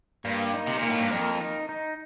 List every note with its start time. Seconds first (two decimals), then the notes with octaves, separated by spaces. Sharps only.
0.25 G2 A#3
0.54 D#4
0.67 C3
0.78 A#2 A#3
0.89 A2
1.00 G2
1.11 F2 A#4
1.41 D#4
1.69 D#4